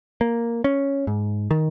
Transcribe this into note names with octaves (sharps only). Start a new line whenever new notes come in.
A#3
C#4
G#2
D#3